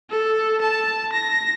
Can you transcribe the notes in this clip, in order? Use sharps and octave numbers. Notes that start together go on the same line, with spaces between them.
A4
A5
A#6